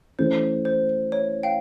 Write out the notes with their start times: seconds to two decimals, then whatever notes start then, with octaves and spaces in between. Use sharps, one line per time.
0.19 E3 A3 C#4 C5
0.65 C5
1.12 C#5
1.43 F5 G5